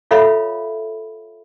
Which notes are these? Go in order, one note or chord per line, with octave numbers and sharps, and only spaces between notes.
F4 A4 C#5 E5 F5 B5